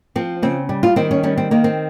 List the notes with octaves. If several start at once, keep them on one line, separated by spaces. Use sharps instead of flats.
F3 C4
C#3 C4
G3
F4
D#3 C4
C#4
G3 C#4
C4
D#3 A#3
C4